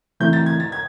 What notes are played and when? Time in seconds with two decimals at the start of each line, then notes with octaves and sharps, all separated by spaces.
0.20 C#3 E3 A3 C4 E4 G6
0.33 A6
0.46 G#6
0.60 A6
0.72 G#6